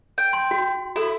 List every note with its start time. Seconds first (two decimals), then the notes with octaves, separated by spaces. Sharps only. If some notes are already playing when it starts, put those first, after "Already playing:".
0.18 G5
0.33 C6
0.51 F#4
0.96 E4 F#4 A4